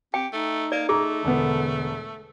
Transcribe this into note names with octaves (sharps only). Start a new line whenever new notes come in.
C4 G4 G5
A3 D#4
A#3 D5
A3 G#4 A#5
E1 D3 B3